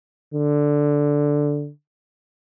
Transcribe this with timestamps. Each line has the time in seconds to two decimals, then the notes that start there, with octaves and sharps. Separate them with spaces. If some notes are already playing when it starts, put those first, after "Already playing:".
0.34 D3